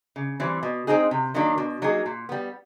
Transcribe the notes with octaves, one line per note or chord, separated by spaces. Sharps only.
C#3
E3 G3 C4 E4
B2
G#3 C4 D#4 G#4
C3
D#3 F#3 A#3 D4
B2
F#3 A#3 D#4 G#4
A#2
G3 B3